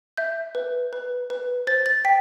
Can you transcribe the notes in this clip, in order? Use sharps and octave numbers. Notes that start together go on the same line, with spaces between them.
E5 G6
B4
B4
B4
C5 A6
A6
G5 B6